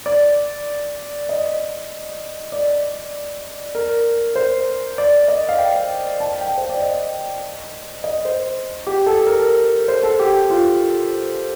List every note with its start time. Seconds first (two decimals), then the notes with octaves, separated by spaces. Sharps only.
0.06 D5
1.29 D#5
2.52 D5
3.75 A#4
4.36 C5
4.98 D5
5.28 D#5
5.49 F5
5.58 G5
6.20 A5
6.41 G5
6.58 C5
6.69 D5
6.82 D#5
8.04 D#5
8.25 C5
8.87 G4
9.06 A4
9.27 A#4
9.88 C5
10.03 A4
10.19 G4
10.50 F4